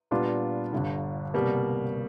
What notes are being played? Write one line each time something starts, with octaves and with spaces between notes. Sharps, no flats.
A#2 G3 B3 D4 F4
G1 G2 D3
C2 B2 G3 A#3